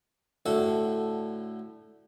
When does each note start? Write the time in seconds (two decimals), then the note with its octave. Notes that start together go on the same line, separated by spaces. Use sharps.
0.46 A2 D3 F#4 A4 F#5